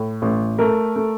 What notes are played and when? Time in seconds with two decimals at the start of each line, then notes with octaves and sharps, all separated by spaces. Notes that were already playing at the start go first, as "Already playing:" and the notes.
Already playing: A2
0.22 A1
0.59 A3 A#4
0.96 A3